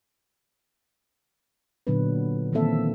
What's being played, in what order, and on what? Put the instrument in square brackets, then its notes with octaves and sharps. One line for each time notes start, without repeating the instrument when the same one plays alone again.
[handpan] A#2 D3 F#3 B3 D4 B4
D#3 E3 A#3 C4 A4 E5